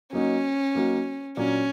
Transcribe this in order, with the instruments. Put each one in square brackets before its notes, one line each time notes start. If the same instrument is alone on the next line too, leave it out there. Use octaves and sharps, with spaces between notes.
[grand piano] F#3 A#3 D#4 F#4 [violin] C#4
[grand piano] F#3 A#3 D#4 F#4
[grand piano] A#2 F#3 A#3 D4 [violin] C#4